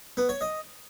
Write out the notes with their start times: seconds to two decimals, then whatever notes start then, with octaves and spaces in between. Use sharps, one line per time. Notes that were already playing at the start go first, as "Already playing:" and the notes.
0.17 B3
0.29 C#5
0.41 D#5